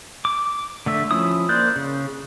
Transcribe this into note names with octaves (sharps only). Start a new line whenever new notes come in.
D6
D3 A3 E5
F3 C#4 E4 D#6
A#3 C5 D5 F#6 G6
C#3